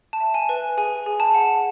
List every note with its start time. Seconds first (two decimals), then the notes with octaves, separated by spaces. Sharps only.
0.13 A5
0.20 E5
0.34 G#5
0.49 B4
0.77 G#4 G#5
1.06 G#4
1.20 A5
1.35 F#5